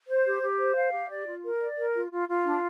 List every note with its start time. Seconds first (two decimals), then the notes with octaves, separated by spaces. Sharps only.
0.08 C5
0.26 G4
0.42 G4
0.58 C5
0.76 F5
0.92 G4
1.10 D5
1.26 F4
1.44 A#4
1.61 D5
1.77 A#4
1.95 F4
2.12 F4
2.28 F4
2.44 D4